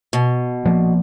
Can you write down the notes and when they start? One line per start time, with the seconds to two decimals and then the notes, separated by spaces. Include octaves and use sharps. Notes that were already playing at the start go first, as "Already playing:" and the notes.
0.13 B2
0.65 F3 A#3